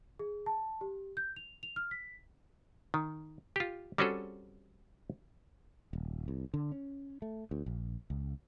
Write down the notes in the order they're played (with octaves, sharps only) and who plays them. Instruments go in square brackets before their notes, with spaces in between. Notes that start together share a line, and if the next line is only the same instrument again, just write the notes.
[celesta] G#4
A5
G4
G6
F7
F7
F6
B6
[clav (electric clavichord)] D#3
F4 G4
G3 C4 C#4 F#4 G#4 A4
[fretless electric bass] D#1
C2
D3
C#4
A3
D2
A#1
C#2